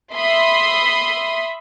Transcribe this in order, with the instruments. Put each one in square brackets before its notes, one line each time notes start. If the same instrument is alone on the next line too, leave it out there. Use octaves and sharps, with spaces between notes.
[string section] E5 B5 C6 D#6